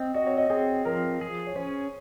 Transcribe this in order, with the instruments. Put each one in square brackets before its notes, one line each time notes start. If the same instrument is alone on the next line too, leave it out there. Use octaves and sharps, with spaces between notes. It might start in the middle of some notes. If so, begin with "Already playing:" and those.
Already playing: [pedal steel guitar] C4 [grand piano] D#5
[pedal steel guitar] F#4 [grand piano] D#5
[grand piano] C#5
D#5
[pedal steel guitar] C4 [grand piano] G#4
[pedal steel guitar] F3 [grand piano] A#4
[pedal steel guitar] G#4
[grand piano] C#5
[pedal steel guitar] C#4 [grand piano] C5